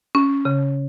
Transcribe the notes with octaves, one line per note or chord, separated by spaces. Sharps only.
C#4
C#3